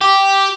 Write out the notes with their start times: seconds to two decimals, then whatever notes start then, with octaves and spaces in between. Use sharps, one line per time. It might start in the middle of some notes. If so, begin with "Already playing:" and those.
0.01 G4